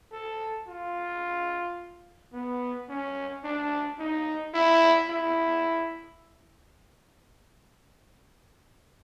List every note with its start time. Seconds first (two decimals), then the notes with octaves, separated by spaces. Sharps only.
0.12 A4
0.68 F4
2.33 B3
2.89 C#4
3.44 D4
3.99 D#4
4.54 E4
5.09 E4